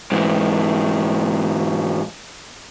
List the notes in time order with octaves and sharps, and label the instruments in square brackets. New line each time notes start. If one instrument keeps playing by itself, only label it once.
[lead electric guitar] G#2 E3